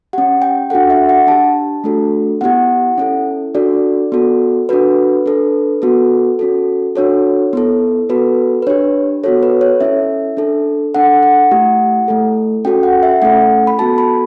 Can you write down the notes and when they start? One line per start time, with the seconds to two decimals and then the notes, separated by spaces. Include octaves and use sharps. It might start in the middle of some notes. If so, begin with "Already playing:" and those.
0.13 C#4 G4 F#5
0.42 G5
0.70 D4 F#4 A4 F#5
0.90 E5
1.09 F#5
1.27 D4 G4 A5
1.84 A3 D4 F#4 A4
2.41 B3 E4 G4 F#5
2.98 C#4 E4 A4
3.55 D4 F#4 A4 D5
4.12 B3 F#4 A4
4.69 D4 F#4 A4 B4
5.26 D4 A4
5.82 B3 F#4 A4
6.39 C#4 F#4 A4
6.96 D4 F#4 A4 C#5
7.53 B3 E4 A4
8.09 B3 F#4 A4 B4
8.62 B4
8.67 D4 G4 C#5
9.24 B3 F#4 A4 C#5
9.43 B4
9.61 C#5
9.81 C#4 E4 A4 E5
10.37 D4 A4
10.95 D4 A4 F#5
11.23 F#5
11.51 A3 E4 G4
12.08 A3 E4 A4
12.65 C#4 F#4 A4 G5
12.83 F#5
13.03 E5
13.22 A3 C#4 E4 A4 F#5
13.67 B5
13.79 B3 F#4 A4 A5
13.98 B5